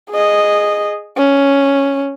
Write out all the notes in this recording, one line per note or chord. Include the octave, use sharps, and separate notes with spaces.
G#4 D#5
C#4